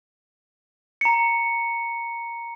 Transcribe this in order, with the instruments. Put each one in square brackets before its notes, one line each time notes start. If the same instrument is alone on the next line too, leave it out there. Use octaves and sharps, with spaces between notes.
[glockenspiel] A#5 C#7